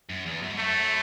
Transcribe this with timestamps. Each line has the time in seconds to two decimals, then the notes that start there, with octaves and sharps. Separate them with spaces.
0.10 F#2
0.26 E2
0.42 F#2
0.50 G#2
0.58 F#2 A3